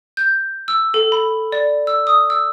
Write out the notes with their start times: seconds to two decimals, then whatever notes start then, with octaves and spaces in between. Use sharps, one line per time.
0.17 G6
0.68 E6
0.94 A4
1.12 B5
1.52 D5
1.87 E6
2.07 D#6
2.30 E6